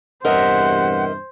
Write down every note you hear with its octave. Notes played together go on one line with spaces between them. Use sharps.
E2 G2 C3 A#4 C5 D#5 E5 F#5